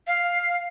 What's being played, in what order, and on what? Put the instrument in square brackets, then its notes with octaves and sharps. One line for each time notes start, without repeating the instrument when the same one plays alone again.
[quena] F5